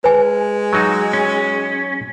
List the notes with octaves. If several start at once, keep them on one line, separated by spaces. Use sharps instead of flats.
G#3 B4 G#5
F#3 D#4 F#4
C#4